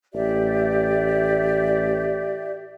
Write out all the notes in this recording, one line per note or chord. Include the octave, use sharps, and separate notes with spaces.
A1 G4 D5 E5